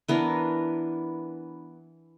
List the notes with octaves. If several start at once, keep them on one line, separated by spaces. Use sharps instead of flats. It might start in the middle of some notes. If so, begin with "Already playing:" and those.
E3 B3 D4 A#4